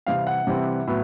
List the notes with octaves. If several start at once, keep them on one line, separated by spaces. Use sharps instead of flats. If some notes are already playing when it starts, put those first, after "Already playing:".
C3 E3 G3 C4 F5
F#5
C3 E3 G3 C4
A2 F#3 B3